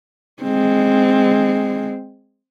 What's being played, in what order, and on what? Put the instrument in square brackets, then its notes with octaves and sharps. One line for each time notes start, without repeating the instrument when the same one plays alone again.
[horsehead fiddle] G#3 C4